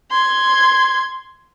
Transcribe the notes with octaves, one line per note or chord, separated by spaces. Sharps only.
C6 G#6